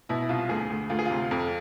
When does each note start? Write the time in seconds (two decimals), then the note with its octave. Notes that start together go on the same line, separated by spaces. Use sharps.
0.09 B2 E4
0.21 E4
0.29 C2 F4
0.49 D2 G#4
0.70 D2
0.89 D2 F4
0.99 G#4
1.06 C3 F4
1.31 F2